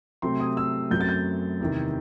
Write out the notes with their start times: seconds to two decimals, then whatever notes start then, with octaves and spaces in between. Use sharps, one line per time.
0.22 C3 F#3 A3 C4 C6
0.40 D#6
0.57 E6
0.91 F#2 F#3 A3 C4 G6
1.01 A6
1.09 G6
1.60 E2 C3 D#3